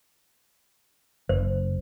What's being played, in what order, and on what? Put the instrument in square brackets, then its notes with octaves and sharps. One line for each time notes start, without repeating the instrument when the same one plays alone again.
[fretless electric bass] F#1 [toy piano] C5